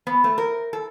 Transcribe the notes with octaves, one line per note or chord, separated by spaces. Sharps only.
B3
A3
A#4
A4